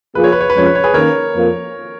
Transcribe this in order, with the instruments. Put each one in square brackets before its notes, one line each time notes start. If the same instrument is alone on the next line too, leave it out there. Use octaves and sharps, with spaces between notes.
[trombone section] F3 A#3 F4 G#4 [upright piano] B4
[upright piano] C#5
B4
C#5
B4
[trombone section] F2 F3 G#3 C#4 [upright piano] C#5
[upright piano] B4
C#5
G#4 B4
[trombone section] D#3 A#3 C#4 [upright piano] A#4 C#5
[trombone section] F2 F3 A#3